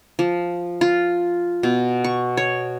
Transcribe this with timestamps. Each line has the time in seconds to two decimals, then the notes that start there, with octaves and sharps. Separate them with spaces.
0.19 F3
0.81 F4
1.63 B2
2.04 C#6
2.37 C#5